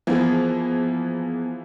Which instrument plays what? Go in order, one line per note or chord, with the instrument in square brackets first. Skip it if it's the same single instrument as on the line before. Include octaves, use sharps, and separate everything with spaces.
[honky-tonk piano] E3 F3 A#3 [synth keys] B3 G#4